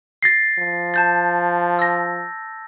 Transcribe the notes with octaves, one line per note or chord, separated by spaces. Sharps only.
A6 A#6 C7
F3
A5 G6 A6
E6 A#6